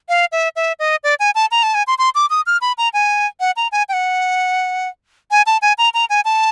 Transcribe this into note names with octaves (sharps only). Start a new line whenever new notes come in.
F5
E5
E5
D#5
D5
G#5
A5
A#5
A5
G#5
C6
C6
D6
D#6
F6
B5
A#5
G#5
F#5
A#5
G#5
G5
F#5
G#5
A5
G#5
A#5
A#5
G#5
A5